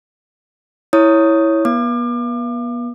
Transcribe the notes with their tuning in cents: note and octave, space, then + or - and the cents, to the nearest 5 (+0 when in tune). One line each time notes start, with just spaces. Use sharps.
E4 -10 C#5 +0 D#6 +0
B3 -35 D6 +35